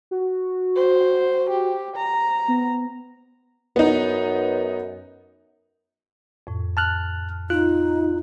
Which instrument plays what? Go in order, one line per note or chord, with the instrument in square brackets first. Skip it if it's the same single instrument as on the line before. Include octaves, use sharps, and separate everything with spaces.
[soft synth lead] F#4
[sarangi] C5
G4
A#5
[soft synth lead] B3
[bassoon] F#2 [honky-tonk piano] B3 D#4
[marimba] F2 A2
[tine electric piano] A5 F6 F#6
[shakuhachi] D#4 [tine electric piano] F4 F#6